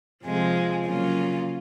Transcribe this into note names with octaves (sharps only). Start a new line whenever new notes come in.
F2 C3 F3 G#3
C#3 F#3 A#3 C#4 F4